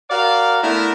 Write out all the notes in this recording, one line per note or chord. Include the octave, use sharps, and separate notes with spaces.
F#4 A#4 D5 F5
A3 B3 D4 E4 A#4